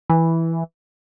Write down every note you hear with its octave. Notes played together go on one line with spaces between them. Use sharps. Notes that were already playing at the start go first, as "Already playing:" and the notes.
E3